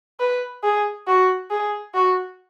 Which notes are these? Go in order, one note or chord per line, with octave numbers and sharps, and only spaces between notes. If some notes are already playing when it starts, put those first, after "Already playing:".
B4
G#4
F#4
G#4
F#4